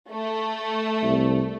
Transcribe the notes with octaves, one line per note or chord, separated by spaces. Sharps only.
A3
C2